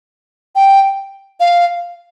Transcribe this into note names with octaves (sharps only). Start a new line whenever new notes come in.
G5
F5